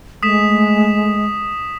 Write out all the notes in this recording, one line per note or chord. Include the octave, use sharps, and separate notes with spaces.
G#3 A3 D#6 B6 E7